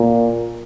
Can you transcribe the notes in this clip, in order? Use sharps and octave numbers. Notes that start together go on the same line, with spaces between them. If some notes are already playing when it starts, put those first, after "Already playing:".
Already playing: A#2